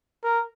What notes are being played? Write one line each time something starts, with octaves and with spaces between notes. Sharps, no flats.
A#4